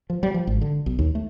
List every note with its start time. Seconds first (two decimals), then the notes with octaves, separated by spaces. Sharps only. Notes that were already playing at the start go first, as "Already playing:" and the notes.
0.10 F3
0.23 G3
0.34 F3
0.47 G#1
0.61 D3
0.86 B1
0.99 D#2
1.15 A3